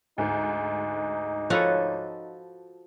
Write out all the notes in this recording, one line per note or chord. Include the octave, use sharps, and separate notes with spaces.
D2 G#2 D#4
F3 F#4 A4 B4 C#5 F5